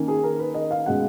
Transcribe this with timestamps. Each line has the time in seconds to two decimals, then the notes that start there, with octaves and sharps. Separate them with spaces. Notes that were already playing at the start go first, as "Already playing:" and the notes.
Already playing: D#3 A#3 C#4
0.08 G#4
0.24 A#4
0.39 B4
0.54 D#5
0.71 F5
0.86 B2 G#3 C#4 F#5